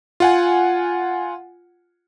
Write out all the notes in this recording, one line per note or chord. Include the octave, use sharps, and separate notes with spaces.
F4 F#5 G#5